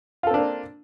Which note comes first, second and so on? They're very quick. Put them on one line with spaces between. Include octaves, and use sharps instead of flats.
F4 A4 C4 D4 A#3